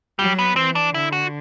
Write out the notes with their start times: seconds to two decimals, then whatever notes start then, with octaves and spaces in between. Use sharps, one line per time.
0.19 F#3 G3
0.39 B3
0.56 E3 C4
0.75 D4
0.94 D3 E4
1.12 F#4